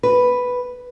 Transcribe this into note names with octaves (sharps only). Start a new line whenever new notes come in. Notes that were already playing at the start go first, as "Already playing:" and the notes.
B4